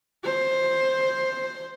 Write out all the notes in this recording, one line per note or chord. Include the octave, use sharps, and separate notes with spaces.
C5